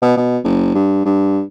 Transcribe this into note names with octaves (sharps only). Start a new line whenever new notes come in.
B2
B2
F#1
G2
G2